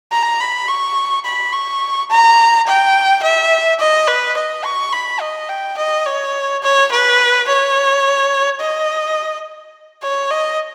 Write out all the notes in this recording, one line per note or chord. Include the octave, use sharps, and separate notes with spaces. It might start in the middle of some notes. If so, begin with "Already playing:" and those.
A#5
B5
C#6
B5
C#6
A#5
G5
E5
D#5
B4
D#5
C#6
B5
D#5
G5
D#5
C#5
C#5
B4
C#5
D#5
C#5
D#5